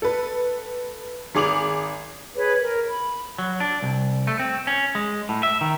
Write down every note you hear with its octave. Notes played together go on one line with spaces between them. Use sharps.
A4 B4
G#1 G#4 D6 F7 F#7
G#4 B4 C#5
A#4
B5
F#3
D4
C2
A3
C4
C#4
G#3
A2
E5
D#3